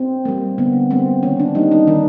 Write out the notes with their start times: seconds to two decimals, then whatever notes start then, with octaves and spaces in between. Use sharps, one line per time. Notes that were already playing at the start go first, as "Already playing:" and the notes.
Already playing: C4
0.25 G3 A#3
0.58 D3 B3
0.91 G3 A#3 C4
1.23 D#3 C#4
1.39 D4
1.55 G3 A#3 D#4
1.71 D#4
1.87 D#3 D4